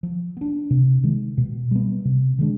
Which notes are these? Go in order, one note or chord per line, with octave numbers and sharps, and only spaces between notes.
F3
B3 D4
C3
D#3 G#3
B2
G3 B3
C3
D#3 G#3 D4